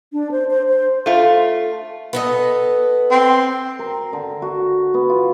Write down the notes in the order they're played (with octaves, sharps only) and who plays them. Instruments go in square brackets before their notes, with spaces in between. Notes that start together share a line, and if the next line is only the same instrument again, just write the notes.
[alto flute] D4
C5
C5
C5
[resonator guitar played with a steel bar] A3 F4
[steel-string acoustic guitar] B3 A4 D#5
[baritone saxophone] C4
[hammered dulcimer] A#4
D3
F#4
B3
F4